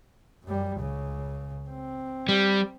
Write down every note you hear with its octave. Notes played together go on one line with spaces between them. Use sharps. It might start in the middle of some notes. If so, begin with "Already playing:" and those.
F#2 G3
C#2 C#3
C4
G3